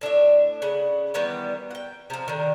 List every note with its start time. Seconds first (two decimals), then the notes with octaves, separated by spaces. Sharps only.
0.01 A2 D4 G#4 E5
0.62 C#3 F#5
1.14 D#3 E3 G3 B3
1.71 F#5 G5
2.10 C3 F3
2.28 D3 D#3